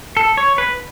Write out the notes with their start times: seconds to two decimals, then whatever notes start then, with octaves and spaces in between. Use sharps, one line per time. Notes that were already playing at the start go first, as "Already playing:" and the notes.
0.17 A4
0.37 C#5
0.58 B4